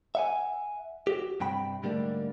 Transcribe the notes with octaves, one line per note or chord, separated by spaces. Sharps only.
E5 F#5 G#5
F#4 G4
G2 C3 G5 B5
G#2 D3 G3 A3 A#3 D4